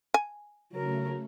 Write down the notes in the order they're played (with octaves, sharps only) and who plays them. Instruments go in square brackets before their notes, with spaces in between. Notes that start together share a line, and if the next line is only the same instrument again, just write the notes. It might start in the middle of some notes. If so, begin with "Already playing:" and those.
[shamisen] G#5
[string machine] C#3 A3 [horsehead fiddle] F#3 A#4